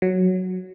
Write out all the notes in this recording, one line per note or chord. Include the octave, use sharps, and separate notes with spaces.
F#3